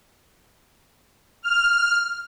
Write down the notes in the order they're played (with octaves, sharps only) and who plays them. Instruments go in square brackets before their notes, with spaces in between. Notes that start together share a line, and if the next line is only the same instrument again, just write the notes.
[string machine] F6